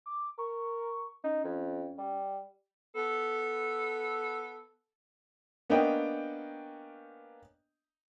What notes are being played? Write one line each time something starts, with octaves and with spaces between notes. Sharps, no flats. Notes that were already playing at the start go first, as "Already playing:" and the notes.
D6
A#4 C#6
C#4 D#4
F2
G3
B3 A4
A#3 B3 C#4 D4 D#5 G5